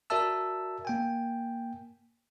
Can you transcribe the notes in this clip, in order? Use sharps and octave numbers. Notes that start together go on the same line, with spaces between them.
F#4 A#4 D5 E5 A5 E6
A#3 G5 G#5